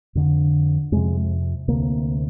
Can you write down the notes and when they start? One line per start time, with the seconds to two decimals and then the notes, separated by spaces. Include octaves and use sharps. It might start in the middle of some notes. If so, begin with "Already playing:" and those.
0.15 F2 D3
0.92 F2 C3 G#3
1.68 D2 C3 A#3